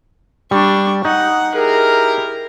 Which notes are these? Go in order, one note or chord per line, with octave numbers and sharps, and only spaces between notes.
G3 D4 C#6
D#4 F#5
E4 G4 G#4 A#4